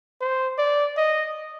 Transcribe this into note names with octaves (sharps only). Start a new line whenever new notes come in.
C5
D5
D#5